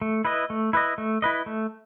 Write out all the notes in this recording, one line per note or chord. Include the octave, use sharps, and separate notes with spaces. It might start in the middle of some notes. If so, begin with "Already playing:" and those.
A3
E4 B4 D#5
A3
E4 B4 D#5
A3
E4 B4 D#5
A3